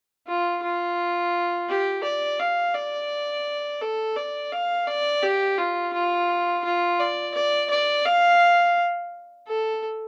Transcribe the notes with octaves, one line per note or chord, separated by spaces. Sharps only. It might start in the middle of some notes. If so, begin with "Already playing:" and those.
F4
F4
G4
D5
F5
D5
A4
D5
F5
D5
G4
F4
F4
F4
D5
D5
D5
F5
A4